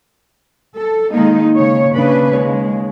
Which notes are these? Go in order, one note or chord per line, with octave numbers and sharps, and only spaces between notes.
A4
D#3 G#3 A#3 D#4
C#3 C#5
C#3 D4 B4
D#2 G#3 C#5